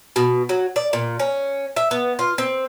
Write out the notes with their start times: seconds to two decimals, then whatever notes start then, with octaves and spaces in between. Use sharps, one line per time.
0.16 B2
0.49 F#3
0.76 D5
0.93 A#2
1.20 C#4
1.76 E5
1.91 B3
2.19 F4
2.38 C4